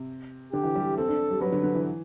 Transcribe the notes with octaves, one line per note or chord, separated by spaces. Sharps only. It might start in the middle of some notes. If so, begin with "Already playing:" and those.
Already playing: C3
D3 G4
E3
G3
C4 A4
D4
G3
F#3 B4
D3
D3
E3